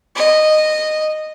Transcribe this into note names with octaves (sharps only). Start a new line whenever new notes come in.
D#5